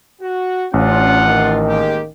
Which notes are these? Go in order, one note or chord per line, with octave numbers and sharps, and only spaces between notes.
F#4
A1 E3 C#4 D4 F4 F#5
D#3
G#3 A#3 G4